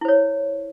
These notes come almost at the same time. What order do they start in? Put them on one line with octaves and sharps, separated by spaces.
E4 C5 C#5